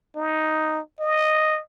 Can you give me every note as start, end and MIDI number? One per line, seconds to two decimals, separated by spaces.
0.16 0.80 63
1.00 1.60 75